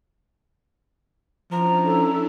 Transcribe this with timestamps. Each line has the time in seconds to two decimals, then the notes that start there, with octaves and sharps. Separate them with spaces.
1.51 F3 C#4 D4 E4 A#5
1.86 A4